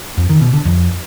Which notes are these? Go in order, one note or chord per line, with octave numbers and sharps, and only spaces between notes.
F2
D#3
B2
D3
F2